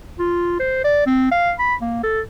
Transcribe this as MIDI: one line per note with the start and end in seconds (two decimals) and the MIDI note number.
0.19 0.57 65
0.60 0.84 72
0.84 1.02 74
1.07 1.29 60
1.32 1.52 77
1.59 1.75 83
1.82 1.99 58
2.04 2.21 69